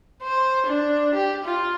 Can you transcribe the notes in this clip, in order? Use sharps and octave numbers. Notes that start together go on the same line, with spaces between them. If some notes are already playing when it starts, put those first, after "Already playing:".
C5
D4
G4
F4